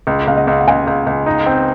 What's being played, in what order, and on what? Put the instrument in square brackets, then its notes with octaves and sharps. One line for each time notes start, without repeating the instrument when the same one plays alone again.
[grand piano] C#2
[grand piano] C#2 [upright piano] F5
[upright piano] D#5 F#5
[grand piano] C#2
[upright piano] F#5
[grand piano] C#2 [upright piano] F5 G#5
[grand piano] C#2
C#2
D#4
C4